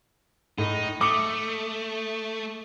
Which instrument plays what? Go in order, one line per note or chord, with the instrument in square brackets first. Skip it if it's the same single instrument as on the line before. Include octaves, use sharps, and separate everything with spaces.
[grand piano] A2 [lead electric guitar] D#4
[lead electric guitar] A3 [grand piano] D6 D#6 C#7